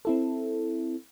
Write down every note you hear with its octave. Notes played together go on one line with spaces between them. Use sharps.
C4 E4 A4